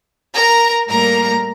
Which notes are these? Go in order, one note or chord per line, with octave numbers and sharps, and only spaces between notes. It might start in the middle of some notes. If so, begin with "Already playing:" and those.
A#4 A#5
A2 G3 A#3 A#4 A#5